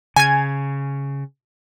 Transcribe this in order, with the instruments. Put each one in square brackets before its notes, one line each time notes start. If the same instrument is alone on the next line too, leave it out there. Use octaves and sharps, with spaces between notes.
[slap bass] C#3 [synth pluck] G#5 G#6